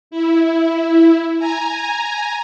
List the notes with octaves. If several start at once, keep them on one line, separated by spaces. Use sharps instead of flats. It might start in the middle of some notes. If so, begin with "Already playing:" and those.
E4
G#5 A#5